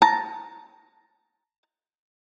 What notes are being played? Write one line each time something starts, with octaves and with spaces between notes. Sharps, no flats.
A5 A#5